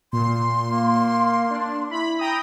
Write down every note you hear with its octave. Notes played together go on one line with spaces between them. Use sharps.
A#2 C6
A#3
D4
E4 B5
G5 A#5 D#6